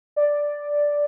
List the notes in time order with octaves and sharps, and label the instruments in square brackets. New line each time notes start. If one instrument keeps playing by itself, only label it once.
[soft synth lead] D5